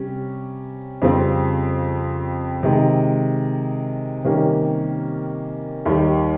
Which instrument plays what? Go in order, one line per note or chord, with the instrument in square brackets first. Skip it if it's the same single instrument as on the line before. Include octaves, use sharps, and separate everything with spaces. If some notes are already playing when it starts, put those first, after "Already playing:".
Already playing: [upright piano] C3 G3 C#4
F2 C#3 G3 C4 F4
C3 D#3 G#3
C3 D#3 G3 A#3 C#4
D#2 D#3 G3